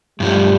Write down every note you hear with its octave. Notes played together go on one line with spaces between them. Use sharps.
G2 F3 G3 A3